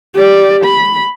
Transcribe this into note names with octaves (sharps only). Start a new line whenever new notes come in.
G4 D5
B5